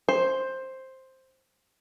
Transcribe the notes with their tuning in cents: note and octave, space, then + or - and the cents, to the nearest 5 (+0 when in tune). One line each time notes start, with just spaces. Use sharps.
C5 +5